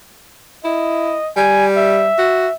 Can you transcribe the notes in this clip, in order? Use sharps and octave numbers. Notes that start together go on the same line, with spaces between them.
E4 D#5
G3 G#5
E5
F#4